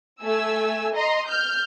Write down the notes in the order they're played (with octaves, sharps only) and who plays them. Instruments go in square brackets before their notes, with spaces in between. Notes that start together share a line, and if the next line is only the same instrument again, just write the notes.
[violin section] A3 G#5 E6
D#5 A#5 C6
F6 G6